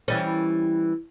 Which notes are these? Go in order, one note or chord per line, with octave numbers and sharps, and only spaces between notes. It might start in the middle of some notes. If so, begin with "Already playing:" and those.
E3 G3 C#4